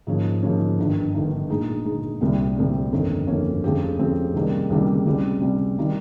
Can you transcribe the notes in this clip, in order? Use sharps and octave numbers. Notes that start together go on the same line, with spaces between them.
G#2 F3 A#3 C#4
G#2 F3 A#3 C#4
G1 G2 D#3
G1 G2 D#3
A#2 G#3 D#4
A#2 G#3 D#4
C2 A#2 G3 C4
C2 A#2 G3 C4
G1 F2 D#3 A#3 C#4
G1 F2 D#3 A#3 C#4
F2 C#3 G#3 C4 G4
F2 C#3 G#3 C4 G4
C#2 C3 D#3 G3 A#3
C#2 C3 D#3 G3 A#3
C#2 C3 G3
C#2 C3 G3
D#3 G3